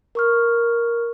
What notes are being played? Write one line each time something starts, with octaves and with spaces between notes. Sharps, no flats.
A#4 C#6 F6